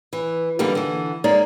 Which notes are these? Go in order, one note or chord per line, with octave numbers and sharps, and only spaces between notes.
E3
D3 E3 G3 A#3 D#4 G4
D3 E3
G#3 A#3 D#4 D5